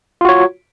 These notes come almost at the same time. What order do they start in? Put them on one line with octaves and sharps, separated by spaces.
F4 F#4 C#5